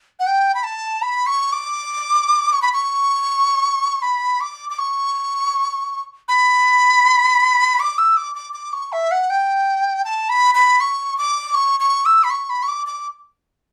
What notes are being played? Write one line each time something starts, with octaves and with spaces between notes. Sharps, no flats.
F#5
G5
B5
A5
B5
C#6
D6
C#6
B5
C#6
B5
D6
D6
C#6
B5
D6
E6
D6
D6
D6
C#6
E5
F#5
G5
A5
B5
B5
C#6
D6
C#6
C#6
E6
B5
C#6
B5
C#6
D6
D6